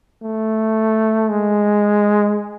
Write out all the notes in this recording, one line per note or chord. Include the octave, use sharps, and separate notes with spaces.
A3
G#3